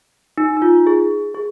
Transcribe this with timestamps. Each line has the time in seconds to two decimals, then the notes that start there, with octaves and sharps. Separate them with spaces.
0.38 D#4
0.57 D#4
0.62 F4
0.87 G#4
1.34 G#4